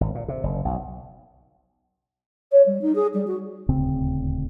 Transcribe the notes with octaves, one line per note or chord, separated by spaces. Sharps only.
G#1
A#2
C3
F#1
B1
C#5
G3
D#4
G#4
G3
F#4
D#1 D2 C#3 C4